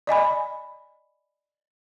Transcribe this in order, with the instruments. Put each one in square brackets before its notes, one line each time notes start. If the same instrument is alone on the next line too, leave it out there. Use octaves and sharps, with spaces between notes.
[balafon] D5 D#5 G#5 B5